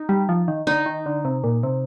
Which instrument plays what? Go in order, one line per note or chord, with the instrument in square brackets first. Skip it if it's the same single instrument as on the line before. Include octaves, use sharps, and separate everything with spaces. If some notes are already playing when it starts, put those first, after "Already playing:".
Already playing: [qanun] D#4
[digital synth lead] G3
F3
D#3
[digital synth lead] D3 [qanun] D#4
[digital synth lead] D#3
D3
C3
A#2
C3